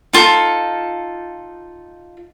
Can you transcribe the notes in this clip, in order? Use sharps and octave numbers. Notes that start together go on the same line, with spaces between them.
D#4 F4 A4